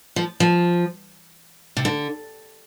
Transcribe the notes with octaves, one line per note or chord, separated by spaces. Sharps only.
F3
F3
C3
D3